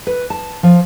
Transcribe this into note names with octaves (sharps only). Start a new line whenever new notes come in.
B4
A5
F3